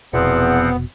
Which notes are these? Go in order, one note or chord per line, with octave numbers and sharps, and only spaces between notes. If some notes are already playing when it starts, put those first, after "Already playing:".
F1 E2 B2 F3 B3 C4 F#5